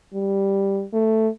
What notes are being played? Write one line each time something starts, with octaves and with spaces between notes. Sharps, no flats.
G3
A3